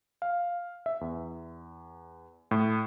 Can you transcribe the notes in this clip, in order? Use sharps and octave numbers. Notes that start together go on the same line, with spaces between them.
F5
E5
E2
A2